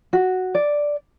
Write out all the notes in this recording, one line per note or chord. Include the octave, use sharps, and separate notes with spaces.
F#4
D5